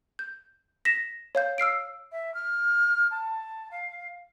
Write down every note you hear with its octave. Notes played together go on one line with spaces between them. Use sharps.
G6
A#6 B6 E7
C#5 F5 G6
E6 F6 C7 D7
E5
F6
A5
F5